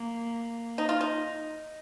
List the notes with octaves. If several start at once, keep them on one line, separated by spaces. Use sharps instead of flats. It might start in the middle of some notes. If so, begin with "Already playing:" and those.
Already playing: A#3
D#4
F4
D#4